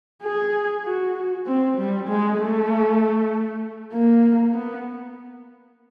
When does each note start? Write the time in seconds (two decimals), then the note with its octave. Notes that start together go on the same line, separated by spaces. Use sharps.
0.23 G#4
0.85 F#4
1.46 C4
1.78 G3
2.08 G#3
2.39 A3
3.93 A#3
4.54 B3